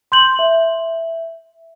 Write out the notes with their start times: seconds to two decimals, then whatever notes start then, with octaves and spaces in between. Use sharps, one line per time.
0.12 C6 G6 F#7
0.39 E5